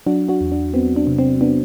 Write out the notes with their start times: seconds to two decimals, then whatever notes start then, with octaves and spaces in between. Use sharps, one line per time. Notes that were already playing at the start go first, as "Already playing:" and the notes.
0.06 F#3 D4 F#4
0.29 D4 F#4
0.41 E2
0.52 D4
0.74 B3 C4
0.96 D4
1.07 C3
1.19 C4
1.41 B3 D4